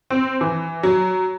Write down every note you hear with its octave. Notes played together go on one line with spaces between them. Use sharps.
C4
E3
F#3